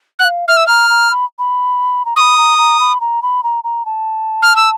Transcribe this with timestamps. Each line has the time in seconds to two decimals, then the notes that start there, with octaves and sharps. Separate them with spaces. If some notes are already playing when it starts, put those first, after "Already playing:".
0.19 F#5 F#6
0.24 F5
0.48 E5 F6
0.57 E6
0.67 A#5 F6
0.90 A#5
1.11 B5
1.39 B5
2.05 A#5
2.16 C#6 D#6
2.21 B5
2.38 A#5
2.58 A#5
2.80 B5
3.01 A#5
3.22 B5
3.43 A#5
3.64 A#5
3.86 A5
4.42 F6
4.56 E6